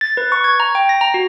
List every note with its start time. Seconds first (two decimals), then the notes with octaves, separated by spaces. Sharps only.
0.01 A6
0.17 B4
0.32 C#6
0.44 G#6
0.60 A#5
0.75 G5
0.89 A#6
1.01 A#5
1.14 F#4